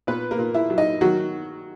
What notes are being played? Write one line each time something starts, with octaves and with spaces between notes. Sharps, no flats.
A#2 B3 B4
A#3 A#4
A#2
E4 E5
F#3
D#4 D#5
D#3 F#3 F#4